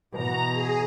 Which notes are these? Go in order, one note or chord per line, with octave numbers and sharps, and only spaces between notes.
B2 E3 A#5
G#4